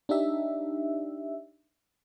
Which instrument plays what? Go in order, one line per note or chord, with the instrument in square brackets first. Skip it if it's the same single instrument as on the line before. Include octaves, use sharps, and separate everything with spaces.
[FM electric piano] D4 D#4 G4 E5